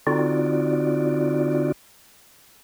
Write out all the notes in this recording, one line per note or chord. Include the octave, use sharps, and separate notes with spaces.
D3 C4 D#4 F4 F#4 D5